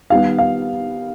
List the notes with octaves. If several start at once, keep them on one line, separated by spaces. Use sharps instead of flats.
D#3 G3 B3 F5
F5